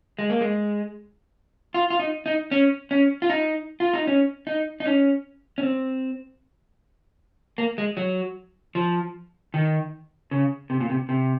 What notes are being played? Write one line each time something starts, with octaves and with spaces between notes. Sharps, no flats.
G#3
A#3
G#3
F4
F4
D#4
D#4
C#4
C#4
F4
D#4
F4
D#4
C#4
D#4
D#4
C#4
C#4
C4
A#3
G#3
F#3
F3
D#3
C#3
C3
A#2
C3
C3